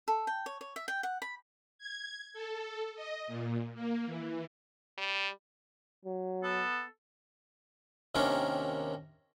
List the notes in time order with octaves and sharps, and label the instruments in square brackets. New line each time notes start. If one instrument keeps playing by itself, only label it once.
[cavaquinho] A4
G5
C#5
C#5
E5
G5
F#5
B5
[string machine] G#6
A4
D#5
A#2
A#3
E3
[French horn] G3
[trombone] F#3
[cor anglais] B3 [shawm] A4
[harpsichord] D#2 C3 D#3 C#4 D4 A#4